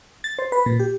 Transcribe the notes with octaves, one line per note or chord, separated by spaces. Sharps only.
A6
C5
B4
A#2
G4